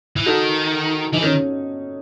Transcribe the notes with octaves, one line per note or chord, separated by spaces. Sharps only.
E3
D#3 F#4 A4
E3 D#4
D#3 C#4